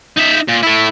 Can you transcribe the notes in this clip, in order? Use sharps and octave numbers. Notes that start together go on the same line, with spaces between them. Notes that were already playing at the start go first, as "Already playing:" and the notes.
D#4 E5
A#2
A3 E4